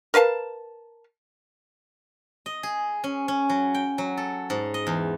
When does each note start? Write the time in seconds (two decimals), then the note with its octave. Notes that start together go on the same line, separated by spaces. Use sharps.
0.14 A#4 B4 F5 A5
2.46 D#5
2.63 G#4
3.04 C#4
3.28 C#4
3.50 F#3
3.74 G5
3.98 F#3
4.17 A4
4.50 G#2
4.74 D#5
4.87 E2